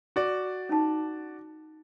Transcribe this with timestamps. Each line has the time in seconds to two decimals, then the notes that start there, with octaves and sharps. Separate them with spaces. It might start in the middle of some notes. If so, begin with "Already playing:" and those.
0.16 F#4 D5
0.69 C#4 D#4 A5